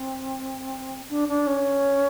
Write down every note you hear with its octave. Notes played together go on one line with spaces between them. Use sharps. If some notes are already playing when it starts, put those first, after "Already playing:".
Already playing: C4
D4
D4
C#4